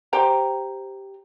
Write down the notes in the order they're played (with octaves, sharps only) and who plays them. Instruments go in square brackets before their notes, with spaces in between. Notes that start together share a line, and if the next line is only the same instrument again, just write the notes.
[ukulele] G4 C5 G5 A#5